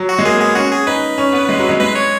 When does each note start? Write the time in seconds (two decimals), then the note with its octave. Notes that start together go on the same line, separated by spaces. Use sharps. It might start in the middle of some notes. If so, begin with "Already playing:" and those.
Already playing: F#3
0.09 F#4
0.19 G#3
0.25 A#3 G#4
0.40 B3 G#4
0.55 C#4 F#4
0.71 G#4
0.87 D#4 B4
1.18 C#4
1.33 B3
1.49 G#3
1.59 F#3
1.69 G#3
1.80 G#3 B4
1.95 C#5